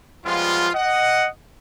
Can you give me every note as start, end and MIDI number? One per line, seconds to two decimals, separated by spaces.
0.25 0.69 53
0.25 0.69 55
0.25 0.69 56
0.25 0.69 59
0.25 0.69 65
0.74 1.28 75
0.74 1.28 78